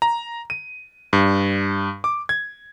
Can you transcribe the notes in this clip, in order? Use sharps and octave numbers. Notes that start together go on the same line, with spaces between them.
A#5
D#7
G2
D6
G#6